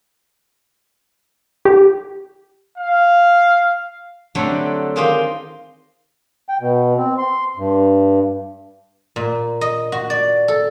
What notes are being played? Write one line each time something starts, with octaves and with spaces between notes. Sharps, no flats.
G4
F5
D3 F#3 G3 A3 C4 E4
D#3 G#3 F4 G4 C5 D#5
G5
B2
C4
C6
G2
A#2
D#5
F#4
D5
A4